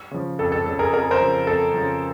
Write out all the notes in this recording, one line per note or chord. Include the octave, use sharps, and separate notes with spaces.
C#3 F3
F2 A4
A4
C#3 F3 A4
G#4 A#4
F2 G#4 A#4
A#4 C5
C#3 F3
F2 A4
C#3 F3